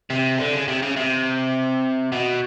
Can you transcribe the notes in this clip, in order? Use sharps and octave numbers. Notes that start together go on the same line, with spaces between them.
C3
D3
C#3
C3
C#3
C3
B2